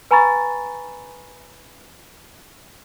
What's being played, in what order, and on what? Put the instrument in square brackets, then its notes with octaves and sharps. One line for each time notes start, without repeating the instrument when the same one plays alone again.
[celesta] B4 G#5 A#5 B5 C#6 A6